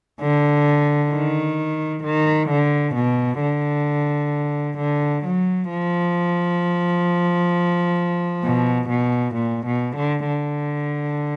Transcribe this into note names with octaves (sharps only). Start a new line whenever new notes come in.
D3
D#3
D#3
D3
B2
D3
D3
F#3
F3
B2
B2
A#2
B2
D3
D3